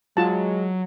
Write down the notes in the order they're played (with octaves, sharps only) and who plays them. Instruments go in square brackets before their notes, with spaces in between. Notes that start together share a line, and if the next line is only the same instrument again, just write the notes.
[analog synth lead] F#3 [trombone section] G#3 [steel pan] F4 A5